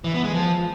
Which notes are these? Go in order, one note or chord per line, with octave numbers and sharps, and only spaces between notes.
E3
B3
G#3
F3